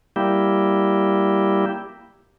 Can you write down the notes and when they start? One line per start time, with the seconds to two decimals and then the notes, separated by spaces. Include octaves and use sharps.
0.16 G3 A#3 E4 G4